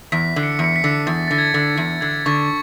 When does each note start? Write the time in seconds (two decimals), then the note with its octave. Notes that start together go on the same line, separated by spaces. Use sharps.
0.12 E2 B6
0.36 D3
0.43 C#7
0.59 E2
0.64 C#7
0.76 B6
0.84 D3
1.07 E2 A6
1.28 D3 A6
1.38 G#6
1.54 D3
1.77 E2
2.01 D3 G#6
2.26 D3 C#6